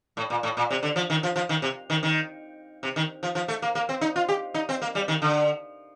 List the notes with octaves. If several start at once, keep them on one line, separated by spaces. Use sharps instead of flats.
A2
A#2
A2
A#2
C3
D3
F3
D#3
F3
F3
D#3
C3
D#3
D#3
C3
D#3
F3
F3
A3
A#3
A#3
C4
D#4
F4
G4
D#4
C4
A#3
G3
D#3
D3